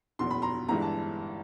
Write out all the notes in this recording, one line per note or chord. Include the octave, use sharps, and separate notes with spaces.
F#1 E2 B2 C6
B5
A#5 C6
G1 G2 E3 G#3 A#5
A5